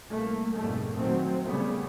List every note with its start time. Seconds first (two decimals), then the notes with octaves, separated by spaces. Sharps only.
0.14 C2 A3 A#3
0.57 F2 G#2 B2 G3 A3 A#3
0.92 A#2 D#3 F#3 A3 C4
1.45 A#2 C#3 G3 A3 B3